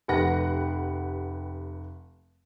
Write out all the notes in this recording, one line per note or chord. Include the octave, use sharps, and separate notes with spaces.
F1 G4 B4 F#5 A#6